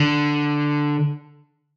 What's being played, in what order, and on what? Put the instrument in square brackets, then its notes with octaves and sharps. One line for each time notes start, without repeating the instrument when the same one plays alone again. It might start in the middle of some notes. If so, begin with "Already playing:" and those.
Already playing: [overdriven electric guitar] D3